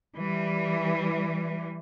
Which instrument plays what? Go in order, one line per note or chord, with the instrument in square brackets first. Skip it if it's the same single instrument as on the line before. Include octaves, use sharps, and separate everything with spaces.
[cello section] E3 G3